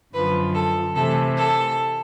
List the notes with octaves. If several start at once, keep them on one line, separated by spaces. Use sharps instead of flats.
F#2 D3 F3 B4
A4
C3 E3 A3 A4
A4